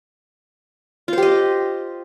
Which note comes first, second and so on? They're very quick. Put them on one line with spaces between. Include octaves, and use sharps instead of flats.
F4 C5 G4 D#5